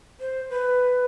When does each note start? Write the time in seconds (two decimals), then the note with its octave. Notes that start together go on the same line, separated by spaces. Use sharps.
0.20 C5
0.50 B4